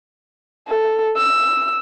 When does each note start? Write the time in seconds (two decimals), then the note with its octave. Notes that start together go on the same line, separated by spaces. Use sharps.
0.68 A4
1.17 E6